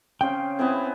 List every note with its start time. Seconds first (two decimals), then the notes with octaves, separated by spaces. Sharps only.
0.21 C#3 C4 F5 G5
0.59 B3 C4 E4 G#4